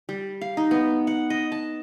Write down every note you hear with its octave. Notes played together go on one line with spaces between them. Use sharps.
G3
F5
D#4
B3
F#5
D#5
A5